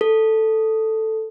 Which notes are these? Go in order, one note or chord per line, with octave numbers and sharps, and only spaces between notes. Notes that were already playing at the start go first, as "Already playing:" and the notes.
A4